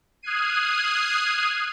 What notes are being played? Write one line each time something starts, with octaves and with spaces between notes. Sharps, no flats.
D#6 F6 F#6 G#6 C7 D#7